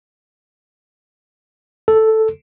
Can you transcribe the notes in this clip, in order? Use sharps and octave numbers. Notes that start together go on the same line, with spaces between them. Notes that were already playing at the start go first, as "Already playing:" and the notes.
A4